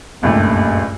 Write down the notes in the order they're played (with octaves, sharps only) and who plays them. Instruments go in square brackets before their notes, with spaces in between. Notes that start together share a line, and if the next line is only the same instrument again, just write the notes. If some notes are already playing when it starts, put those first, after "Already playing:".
[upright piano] F#1 C#2 G2 A#2 A3 G4